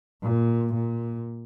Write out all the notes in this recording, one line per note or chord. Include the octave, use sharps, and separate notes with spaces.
A#2
A#2